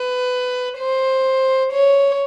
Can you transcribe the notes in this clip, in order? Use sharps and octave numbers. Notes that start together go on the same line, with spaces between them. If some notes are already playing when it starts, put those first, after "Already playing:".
Already playing: B4
C5
C#5